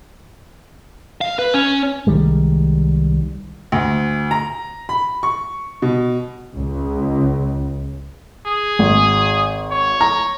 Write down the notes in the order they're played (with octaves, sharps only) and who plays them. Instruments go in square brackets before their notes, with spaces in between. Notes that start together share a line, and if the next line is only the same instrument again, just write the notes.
[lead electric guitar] F5
B4
C#4
[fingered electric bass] C2 D#3 G3 G#3
[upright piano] D2
A#5
B5
C#6
B2
[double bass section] C#2
[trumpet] G#4
[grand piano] G#1
[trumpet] C#5
[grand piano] A#5